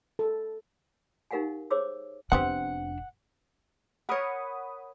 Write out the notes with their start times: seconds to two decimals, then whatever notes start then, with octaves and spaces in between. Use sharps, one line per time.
0.19 A4
1.31 D#4 G4 A#4 F5 F#5 G#5
1.71 G#4 C5 C#5 D6 E6
2.32 F1 B3 C4 D4 G4 F#5
4.09 A#4 C#5 F#5 B5 D#6